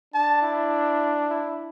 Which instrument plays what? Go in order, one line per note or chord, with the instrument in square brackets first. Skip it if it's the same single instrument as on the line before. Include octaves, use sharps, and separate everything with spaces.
[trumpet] D4 [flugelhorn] A5
[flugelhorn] E4
E4